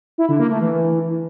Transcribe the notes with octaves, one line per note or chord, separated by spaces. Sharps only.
E4
D3
A#3
A3
E3